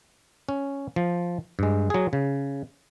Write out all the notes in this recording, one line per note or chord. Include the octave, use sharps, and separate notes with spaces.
C#4
F3
G2 G#3
F#3 G#4
C#3